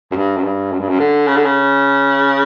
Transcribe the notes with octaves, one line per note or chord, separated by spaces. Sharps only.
F#2
G2
F#2
G2
F#2
G2
F#2
D3
C#3
D3
C#3